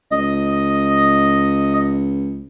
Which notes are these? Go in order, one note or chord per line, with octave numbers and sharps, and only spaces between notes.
C#2 D#5